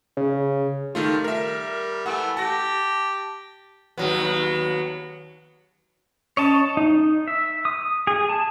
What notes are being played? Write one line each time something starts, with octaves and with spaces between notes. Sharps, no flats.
C#3
D#3 G3 A3 F4
A#4 E5
E3 A3 F#5
G4 A5 A#6
D#2 F#3 B3
C#4 C#5 D#5 A5
D#4
E5
D#6
G#4
A5